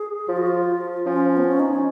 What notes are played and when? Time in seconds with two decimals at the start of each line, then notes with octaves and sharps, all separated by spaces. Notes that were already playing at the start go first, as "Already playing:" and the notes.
Already playing: G#4
0.28 F3 F4
0.37 F#4
0.47 F4
1.06 F3 C#4
1.37 B3
1.44 C#4
1.60 D#4
1.71 C#4